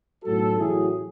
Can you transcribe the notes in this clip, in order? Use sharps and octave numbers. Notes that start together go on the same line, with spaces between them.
B1 A2 F#3 F#4 A4
A1 A2 F#3 E4 G#4